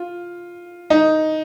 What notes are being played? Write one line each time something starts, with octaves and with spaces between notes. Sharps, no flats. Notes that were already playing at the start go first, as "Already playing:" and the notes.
Already playing: F4
D#4